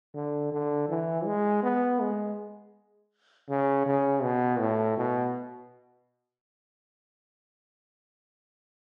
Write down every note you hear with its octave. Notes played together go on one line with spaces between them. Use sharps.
D3
D3
E3
G#3
B3
G#3
C#3
C#3
B2
A2
B2